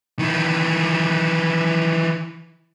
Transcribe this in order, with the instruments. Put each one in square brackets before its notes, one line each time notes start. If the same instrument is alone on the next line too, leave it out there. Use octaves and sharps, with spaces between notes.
[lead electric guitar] D#3 E3